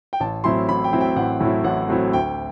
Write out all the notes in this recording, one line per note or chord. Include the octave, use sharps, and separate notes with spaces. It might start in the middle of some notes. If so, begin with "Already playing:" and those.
G5
A1 A5
A2 F#3 C4 E4 C6
A1 B5
G5
A2 F#3 C4 E4
G5
A1 F#5
A2 F#3 C4 E4
A1 F#5
A2 F#3 C4 E4
D2 G5